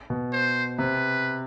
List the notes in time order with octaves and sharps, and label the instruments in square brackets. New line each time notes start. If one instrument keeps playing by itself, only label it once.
[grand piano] B2
[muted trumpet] C5
[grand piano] C3 [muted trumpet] B4